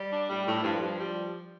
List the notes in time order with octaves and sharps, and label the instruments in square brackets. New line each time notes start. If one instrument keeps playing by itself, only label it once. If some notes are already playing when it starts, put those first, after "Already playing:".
Already playing: [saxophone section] G3
D4
[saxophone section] A2 [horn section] G3
[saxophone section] A2
[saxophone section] G2 [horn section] F3
[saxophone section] G2
G3